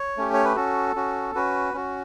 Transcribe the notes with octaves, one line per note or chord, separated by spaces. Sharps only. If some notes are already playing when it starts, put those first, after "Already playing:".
Already playing: C#5
A3 C#4 G4
C#5
B4
C#4 F#4 A4
C#4 F#4
C#4 F#4 B4
C#4 F#4